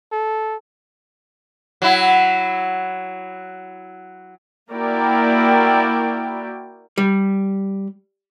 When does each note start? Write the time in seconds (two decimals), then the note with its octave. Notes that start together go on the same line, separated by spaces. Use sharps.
0.12 A4
1.82 F#3 E4
4.71 A#3 E4 F#4 A#4 D5 G5
6.98 G3